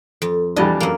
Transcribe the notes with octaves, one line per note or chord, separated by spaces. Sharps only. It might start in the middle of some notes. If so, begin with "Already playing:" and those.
F2
E2 G3 D4 D#5
F#2 A#3